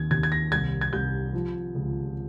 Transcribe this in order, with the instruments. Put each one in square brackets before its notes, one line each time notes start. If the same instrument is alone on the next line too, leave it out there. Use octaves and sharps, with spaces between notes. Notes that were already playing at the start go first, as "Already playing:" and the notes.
Already playing: [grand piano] D#2 G#6
D#2 G#6
G#6
A#6
C2 G#6
G#6
C2 G6
F3
C#2